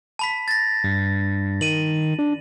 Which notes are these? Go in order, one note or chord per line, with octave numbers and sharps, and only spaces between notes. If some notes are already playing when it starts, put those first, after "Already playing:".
A5 B5 B6
A6 A#6
G2
D#3 D#7 F#7
D4